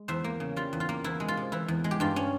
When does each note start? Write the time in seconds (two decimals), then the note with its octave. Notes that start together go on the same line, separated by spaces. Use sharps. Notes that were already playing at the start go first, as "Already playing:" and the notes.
Already playing: G#3
0.08 E2 C5 E5
0.24 A#3
0.40 C#3
0.56 G3 F4
0.73 E2
0.80 F4
0.89 A#3
1.04 E2 E4
1.20 G#3
1.28 F4
1.37 C3
1.52 E3 E4
1.68 E2
1.84 G#3
1.91 G4
2.00 G2 F4
2.16 C#4